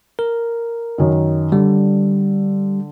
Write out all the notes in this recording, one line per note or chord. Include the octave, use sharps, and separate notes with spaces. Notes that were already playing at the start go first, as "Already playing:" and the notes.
A#4
F#2 D#3
D3 G3